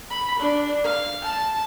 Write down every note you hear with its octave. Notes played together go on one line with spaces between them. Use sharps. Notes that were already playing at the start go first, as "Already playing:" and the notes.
B5
D4
F5
A5